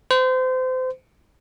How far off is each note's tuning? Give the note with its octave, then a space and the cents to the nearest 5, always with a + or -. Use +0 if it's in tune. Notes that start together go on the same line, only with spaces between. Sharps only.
C5 -30